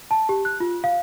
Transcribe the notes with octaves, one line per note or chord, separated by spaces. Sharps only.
A5
G4
F#6
F4
F5